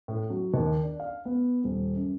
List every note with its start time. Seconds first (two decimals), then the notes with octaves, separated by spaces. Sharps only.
0.08 A2
0.30 F#3
0.54 D#2
0.83 D4
1.00 F5
1.25 B3
1.64 D#1
1.95 F#2